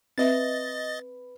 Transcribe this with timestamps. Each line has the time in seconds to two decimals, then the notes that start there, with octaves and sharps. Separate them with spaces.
0.18 C4 B4 D#5 E5 A6